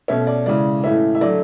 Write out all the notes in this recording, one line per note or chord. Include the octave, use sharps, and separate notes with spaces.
B2 A3 C#4 E5
D5
C#3 E3 G#3 D5
A2 E3 A3 C#4 E5
E5
D3 F#3 A3 D5